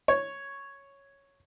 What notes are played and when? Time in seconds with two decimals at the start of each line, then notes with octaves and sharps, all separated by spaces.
0.08 C#5